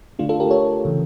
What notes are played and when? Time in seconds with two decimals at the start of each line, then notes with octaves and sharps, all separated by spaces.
0.19 D3 A3 D4 F4
0.29 F4 A4
0.40 G4 A#4
0.51 A4 C#5
0.85 C#3 E3